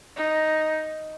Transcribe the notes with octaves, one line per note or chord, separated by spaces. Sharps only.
D#4